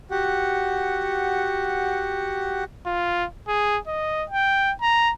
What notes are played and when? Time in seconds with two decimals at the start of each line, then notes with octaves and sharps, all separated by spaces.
0.11 F#4 G4 F#5
2.86 F4
3.48 G#4
3.87 D#5
4.30 G5
4.82 A#5